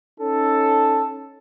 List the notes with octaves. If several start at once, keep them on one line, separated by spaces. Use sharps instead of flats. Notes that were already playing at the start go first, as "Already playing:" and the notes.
C#4 D#4 A4